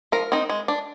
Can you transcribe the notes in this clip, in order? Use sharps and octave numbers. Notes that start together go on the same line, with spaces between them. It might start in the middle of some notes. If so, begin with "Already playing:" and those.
F3 A#4
C4 D#4
G#3
D4